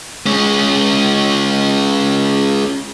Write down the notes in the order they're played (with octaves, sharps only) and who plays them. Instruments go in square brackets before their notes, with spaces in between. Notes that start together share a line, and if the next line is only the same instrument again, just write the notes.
[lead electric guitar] G#3 C#4